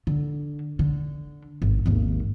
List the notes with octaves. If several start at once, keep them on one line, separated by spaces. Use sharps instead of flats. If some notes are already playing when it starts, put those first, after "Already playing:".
D3
D3
G#1
G#1 D#2